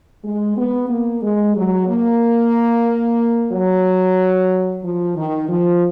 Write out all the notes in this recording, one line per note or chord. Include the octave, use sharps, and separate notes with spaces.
G#3
B3
A#3
G#3
F#3
A#3
F#3
F3
D#3
F3